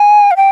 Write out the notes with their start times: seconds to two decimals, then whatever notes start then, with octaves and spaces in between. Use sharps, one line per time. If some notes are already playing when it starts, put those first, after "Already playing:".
Already playing: G#5
0.31 F5
0.37 G5